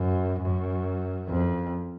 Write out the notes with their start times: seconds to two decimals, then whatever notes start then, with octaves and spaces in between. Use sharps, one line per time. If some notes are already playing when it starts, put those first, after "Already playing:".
Already playing: F#2
0.39 F#2
1.28 F2